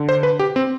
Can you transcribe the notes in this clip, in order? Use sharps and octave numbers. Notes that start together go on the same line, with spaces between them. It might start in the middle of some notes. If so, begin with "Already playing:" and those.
Already playing: D3
C5
B4
G4
C4